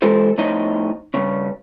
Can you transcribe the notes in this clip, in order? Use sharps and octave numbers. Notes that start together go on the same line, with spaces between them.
E3 G#3 F4 A4 C5
A2 F3 D#4 C#5 D#5 A#5
G2 C#3 C#4